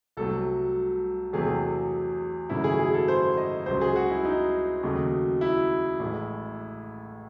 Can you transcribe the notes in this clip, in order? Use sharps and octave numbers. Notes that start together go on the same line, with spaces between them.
C2 C3 F#3 A3 A4
E2 C3 F#3 A3 G#4
G#1 F#2 C#3 F#3 A3 E4
G#4
G#4
A4
C5
D#5
C#2 C#3 F#3 C5
G#4
F#4
E4
D#4
D#2 C#3 F#3 A3
E4
A1 A2 G#3